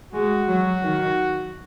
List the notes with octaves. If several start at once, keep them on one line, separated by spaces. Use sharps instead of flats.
G#3 F#4
F#3
D#3